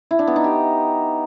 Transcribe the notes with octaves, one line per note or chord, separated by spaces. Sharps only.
E4
D4
B3
D#4
G4